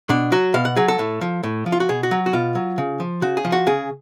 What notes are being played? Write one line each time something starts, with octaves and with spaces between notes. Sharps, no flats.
B2 D4
F#3 F#4
B2 F5
F#5
F#3 G#4
A4
A2
F3
A2
F3
F4
F#4
B2 G#4
F#4
F#3
F#4
B2 F4
F#3
C#3
F3
C#3 F#4
G#4
F3
F#4
C#3 G#4